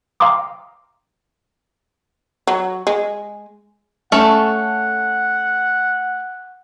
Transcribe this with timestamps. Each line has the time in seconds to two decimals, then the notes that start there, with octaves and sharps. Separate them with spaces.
0.20 F5 G5 A#5 C6 D6 D#6
2.47 F#3
2.87 G#3
4.12 A3 C#4 A4 F#5